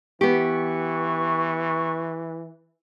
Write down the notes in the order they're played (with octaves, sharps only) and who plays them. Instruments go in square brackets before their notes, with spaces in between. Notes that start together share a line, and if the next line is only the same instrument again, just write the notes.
[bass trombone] E3 [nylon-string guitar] B3 G4 [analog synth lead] C#6